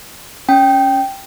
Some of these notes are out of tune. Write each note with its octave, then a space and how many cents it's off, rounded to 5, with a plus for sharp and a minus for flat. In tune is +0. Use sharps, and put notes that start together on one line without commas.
C#4 +0 G5 +0